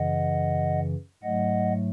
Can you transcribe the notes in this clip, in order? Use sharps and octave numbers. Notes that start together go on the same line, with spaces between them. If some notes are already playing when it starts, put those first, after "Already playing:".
Already playing: F#2 C#3 E3 D#5 F#5
G#2 F#3 A3 D#5 F#5